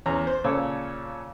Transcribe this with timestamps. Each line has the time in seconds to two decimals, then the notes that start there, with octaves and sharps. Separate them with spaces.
0.06 E2 C#4 A#5
0.27 C5
0.44 A#2 C#3 A4 C#5